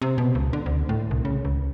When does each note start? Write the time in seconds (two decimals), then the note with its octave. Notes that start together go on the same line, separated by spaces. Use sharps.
0.02 C3
0.18 B2
0.35 C#2
0.53 D3
0.66 D2
0.89 A2
1.11 C2
1.25 C#3
1.45 C#2